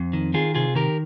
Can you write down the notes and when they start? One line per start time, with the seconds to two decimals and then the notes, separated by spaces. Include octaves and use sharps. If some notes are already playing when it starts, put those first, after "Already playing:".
Already playing: F2 C4
0.13 D#3
0.34 D#3 F4 G#4
0.55 C3 F4 G#4
0.75 D#3 G4 A#4